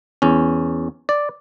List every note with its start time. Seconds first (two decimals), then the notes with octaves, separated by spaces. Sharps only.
0.22 E2 C#4
1.09 D5